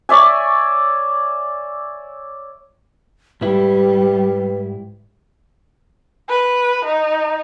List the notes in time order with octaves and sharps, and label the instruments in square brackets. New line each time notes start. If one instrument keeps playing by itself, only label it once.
[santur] C#5 D5 E5 G#5
[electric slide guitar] G#2 E4 [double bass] G3 [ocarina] B4
[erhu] B4
D#4